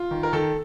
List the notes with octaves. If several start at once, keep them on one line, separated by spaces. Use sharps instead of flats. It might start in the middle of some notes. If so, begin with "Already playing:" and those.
Already playing: F4
D#3
A#4
D#3 A4